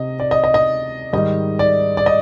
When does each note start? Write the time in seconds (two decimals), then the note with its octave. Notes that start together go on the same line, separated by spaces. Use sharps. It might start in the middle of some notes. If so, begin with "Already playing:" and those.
Already playing: C3 D#5
0.20 D5
0.31 D#5
0.44 D#5
0.54 D#5
1.13 G#2 D#3 G3 D#5
1.59 D5
1.97 D5
2.06 D#5